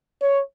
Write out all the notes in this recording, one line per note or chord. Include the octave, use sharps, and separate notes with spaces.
C#5